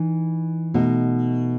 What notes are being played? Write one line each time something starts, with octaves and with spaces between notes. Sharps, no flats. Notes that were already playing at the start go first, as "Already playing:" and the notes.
Already playing: E3 D#4
B2 A3 D#4